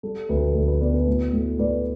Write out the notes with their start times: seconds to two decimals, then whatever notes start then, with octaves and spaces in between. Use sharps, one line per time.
0.03 G3 A4
0.29 D2 B4
0.55 D2 A4
0.68 B4
0.81 B3 B4 D5
0.94 B4
1.07 A2
1.33 A2
1.59 A2 B4 D5